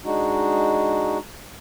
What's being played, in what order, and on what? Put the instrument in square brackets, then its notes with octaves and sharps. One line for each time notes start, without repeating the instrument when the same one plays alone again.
[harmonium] G#3 D4 D#4 F#4